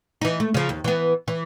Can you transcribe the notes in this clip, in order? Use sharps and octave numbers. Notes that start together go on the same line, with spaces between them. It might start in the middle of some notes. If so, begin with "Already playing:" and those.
E3 D#4
A3
C#3 F3
D#2
E3 B3
E3